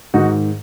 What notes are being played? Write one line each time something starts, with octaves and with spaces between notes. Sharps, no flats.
G#2 D#3 D#4 F#4